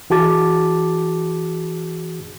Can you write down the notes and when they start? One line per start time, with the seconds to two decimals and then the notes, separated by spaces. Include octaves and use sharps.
0.10 E3 F#4 G#4 A5 D6 A6